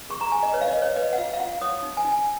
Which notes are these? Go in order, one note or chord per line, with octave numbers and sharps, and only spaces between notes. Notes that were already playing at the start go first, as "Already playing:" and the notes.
G#4 C#6
A#5
G#4 G#5
D#5
B4 C#5
F5
D#5
B4
C#5
B4 D#5
F#5
F4 F5
F5
F4 F#5
C#5 D#6
D#4
G#5
D#4
G#5